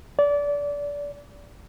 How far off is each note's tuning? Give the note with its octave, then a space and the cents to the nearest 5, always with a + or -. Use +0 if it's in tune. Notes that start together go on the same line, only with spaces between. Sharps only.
D5 -25